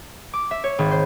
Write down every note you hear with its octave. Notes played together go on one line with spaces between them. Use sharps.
D6
E5
C#5
G#1
C5